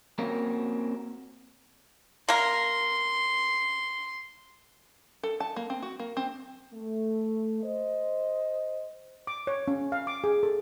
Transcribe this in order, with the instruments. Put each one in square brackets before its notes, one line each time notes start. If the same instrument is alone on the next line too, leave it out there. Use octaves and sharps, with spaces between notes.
[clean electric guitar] A#3 C4 C#4 F#4 A#4
[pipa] A#3 A#4 [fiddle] C6
[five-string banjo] A4
A5
A#3
C4
F#4
A#3
C4
[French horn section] A3
C5 D#5
[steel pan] D6
C#5
C#4
F5
D6
G#4
A4